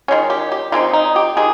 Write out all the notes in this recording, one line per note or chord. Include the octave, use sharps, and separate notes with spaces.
D#3 G#3 C#4
G4
G4
D#3 G#3 C4 D#4 F4
D#4
G4
D#3 G#3 G#4